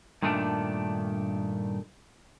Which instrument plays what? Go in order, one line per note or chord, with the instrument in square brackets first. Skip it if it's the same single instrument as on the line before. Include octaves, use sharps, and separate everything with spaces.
[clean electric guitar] G2 A#2 D#3 A3 C4 D4